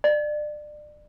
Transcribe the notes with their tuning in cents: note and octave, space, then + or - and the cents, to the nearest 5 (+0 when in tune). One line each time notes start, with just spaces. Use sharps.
D5 +30